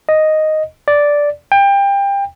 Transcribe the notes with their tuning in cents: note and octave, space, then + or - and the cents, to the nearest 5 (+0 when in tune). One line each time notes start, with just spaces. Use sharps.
D#5 +0
D5 -5
G5 +25